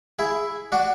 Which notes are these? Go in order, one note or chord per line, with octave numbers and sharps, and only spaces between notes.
E4 G#4
D4 F#4